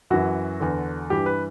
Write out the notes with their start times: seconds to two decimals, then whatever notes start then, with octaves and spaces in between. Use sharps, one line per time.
0.10 F#2 E3 F#4
0.60 E2 D3
1.10 G2 E3 G4
1.26 B4